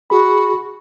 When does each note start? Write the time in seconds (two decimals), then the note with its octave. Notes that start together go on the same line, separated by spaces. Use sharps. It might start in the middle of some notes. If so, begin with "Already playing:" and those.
0.10 F#4 G#4 B5